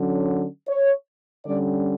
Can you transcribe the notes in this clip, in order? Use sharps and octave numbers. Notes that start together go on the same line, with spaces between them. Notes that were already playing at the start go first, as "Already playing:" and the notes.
Already playing: D3 F#3 C#4
C#5
D3 G3 C#4 D5